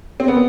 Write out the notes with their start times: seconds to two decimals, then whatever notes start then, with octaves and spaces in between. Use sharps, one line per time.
0.20 C4
0.28 B3